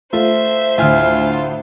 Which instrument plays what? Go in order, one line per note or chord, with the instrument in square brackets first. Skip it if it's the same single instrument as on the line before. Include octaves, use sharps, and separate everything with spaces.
[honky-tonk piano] A3 F4 [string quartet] C5 [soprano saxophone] E5
[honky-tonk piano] D2 A2 [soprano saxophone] F4 [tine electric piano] E5 G#5 F6